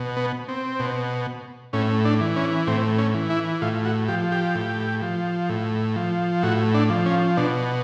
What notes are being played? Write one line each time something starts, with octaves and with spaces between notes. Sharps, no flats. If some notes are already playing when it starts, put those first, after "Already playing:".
Already playing: B2
B3
C4
B2
A2 C#4
D4
E3
C#4
A2 C4
C#4
E3
E4
A2 F4
F#4
F3 G4
G4
A2
F3
A2
F3
A2 F#4
D4
F3
C#4
B2 D4